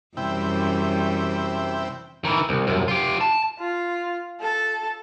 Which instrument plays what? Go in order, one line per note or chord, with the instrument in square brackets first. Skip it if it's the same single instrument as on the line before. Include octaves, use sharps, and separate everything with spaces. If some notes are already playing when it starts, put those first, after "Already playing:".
[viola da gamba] F#2 E3 G3 [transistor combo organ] C3 E4 G5
[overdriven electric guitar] D#3 E3
C2
C2 F#2
F4 G4
A5
[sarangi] F4
A4